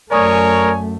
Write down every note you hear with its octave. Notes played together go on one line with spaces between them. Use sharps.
F#2 A3 A#4 C#5 D5 G#5 C#6 D#6